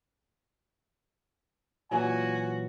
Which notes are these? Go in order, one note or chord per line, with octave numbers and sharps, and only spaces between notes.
A#2 E3 F#3 F#4 G#5